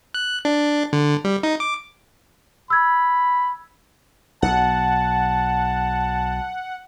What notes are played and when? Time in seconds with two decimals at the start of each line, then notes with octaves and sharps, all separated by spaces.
0.14 F#6
0.45 D4
0.93 D3
1.25 G3
1.43 D#4
1.60 D6
2.70 B5 E6 G#6
4.42 B1 F#5 A5